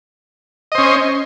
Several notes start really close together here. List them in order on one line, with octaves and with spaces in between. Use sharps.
D#5 C5 C#4